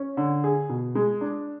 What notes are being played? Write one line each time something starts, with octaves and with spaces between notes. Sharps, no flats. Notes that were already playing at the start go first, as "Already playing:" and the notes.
Already playing: C#4
D3
G#4
B2
G#3
D4